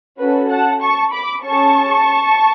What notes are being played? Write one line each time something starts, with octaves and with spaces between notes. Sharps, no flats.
C#4 F#4 A4 B4
F#5 A5
A5 C#6
B5 D6
C#4 G#4 A5 C#6